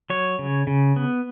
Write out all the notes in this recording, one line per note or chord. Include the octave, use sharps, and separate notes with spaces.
F#3 C#5
C#3
C#3
B3